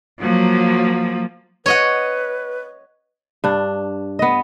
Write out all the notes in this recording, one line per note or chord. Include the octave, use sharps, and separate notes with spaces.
F3 F#3 A#3
B4 C#5 D#5 F#5
G2 D4
B3 D#5